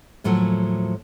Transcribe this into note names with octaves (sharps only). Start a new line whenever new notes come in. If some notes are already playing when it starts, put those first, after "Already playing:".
D#2 A2 F3 F#3 A3